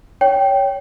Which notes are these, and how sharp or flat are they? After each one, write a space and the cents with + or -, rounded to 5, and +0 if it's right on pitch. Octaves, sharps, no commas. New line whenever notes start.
C#5 +15 G5 -5